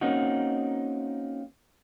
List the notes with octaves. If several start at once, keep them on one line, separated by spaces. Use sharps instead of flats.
A#3 C4 C#4 D#4 F#4